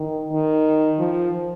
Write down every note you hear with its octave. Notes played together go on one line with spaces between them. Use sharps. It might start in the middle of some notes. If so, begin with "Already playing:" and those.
Already playing: D#3
D#3
F3